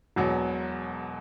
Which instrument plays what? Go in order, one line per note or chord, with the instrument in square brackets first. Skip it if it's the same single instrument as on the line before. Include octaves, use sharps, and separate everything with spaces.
[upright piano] E1 E2 B2 F#3